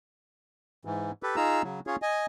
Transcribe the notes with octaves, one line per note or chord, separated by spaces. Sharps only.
G#2 E3
G4 A4 B4
D#4 F4 G#4 A#5 E6
C#3 F#3
C#4 F4 G#4 C#5
D#5 G#5